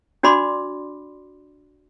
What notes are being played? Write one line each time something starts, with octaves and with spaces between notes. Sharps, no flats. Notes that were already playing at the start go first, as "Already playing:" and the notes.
D4 F#4 D5 B5 C6 D6